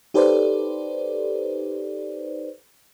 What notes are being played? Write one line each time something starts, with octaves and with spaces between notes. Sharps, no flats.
D#4 G4 A4 B4 C5 D5